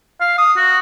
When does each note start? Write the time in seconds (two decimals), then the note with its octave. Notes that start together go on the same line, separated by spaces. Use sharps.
0.21 F5
0.38 D#6
0.57 F#4